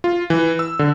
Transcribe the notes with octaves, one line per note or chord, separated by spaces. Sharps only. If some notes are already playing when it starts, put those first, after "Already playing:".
F4
E3
E6
D3